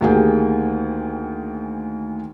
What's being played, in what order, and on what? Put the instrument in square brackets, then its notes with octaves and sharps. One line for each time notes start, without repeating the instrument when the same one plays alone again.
[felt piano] D2 D#3 A#3 G4 G#4 G5